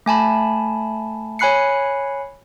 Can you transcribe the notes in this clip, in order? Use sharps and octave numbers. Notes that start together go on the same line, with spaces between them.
A3 G#5 A5 B5
C#5 G#5 B5 F#6 C7 C#7